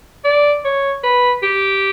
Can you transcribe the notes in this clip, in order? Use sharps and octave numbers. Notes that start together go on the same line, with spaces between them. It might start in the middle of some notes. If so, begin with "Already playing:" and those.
D5
C#5
B4
G4